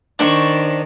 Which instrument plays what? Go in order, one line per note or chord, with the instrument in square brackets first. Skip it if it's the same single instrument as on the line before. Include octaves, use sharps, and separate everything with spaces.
[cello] D#3 [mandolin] D4 C5 C#6